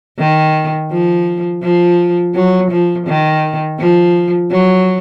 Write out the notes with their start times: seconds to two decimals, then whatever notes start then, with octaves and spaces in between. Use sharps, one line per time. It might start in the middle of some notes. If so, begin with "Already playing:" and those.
0.18 D#3
0.90 F3
1.62 F3
2.34 F#3
2.70 F3
3.06 D#3
3.79 F3
4.50 F#3